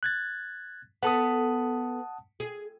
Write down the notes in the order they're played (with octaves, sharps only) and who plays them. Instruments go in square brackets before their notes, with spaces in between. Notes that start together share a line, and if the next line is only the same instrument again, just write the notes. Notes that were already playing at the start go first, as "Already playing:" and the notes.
[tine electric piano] F#6 G#6 A6
[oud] B3 A4 [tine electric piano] F#5 A5 D#6
[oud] G#4